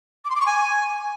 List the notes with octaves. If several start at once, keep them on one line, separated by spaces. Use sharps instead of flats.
D6
C6
D6
C#6
G#5